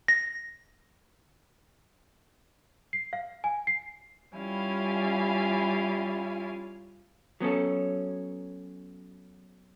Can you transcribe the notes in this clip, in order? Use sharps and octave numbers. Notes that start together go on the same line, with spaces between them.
A#6
C7
F5
G#5
C7
G3 C#4 E4 F4 F5 G#5
F#3 B3 C#4 A4